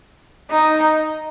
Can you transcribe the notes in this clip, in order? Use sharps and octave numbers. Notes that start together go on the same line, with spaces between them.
D#4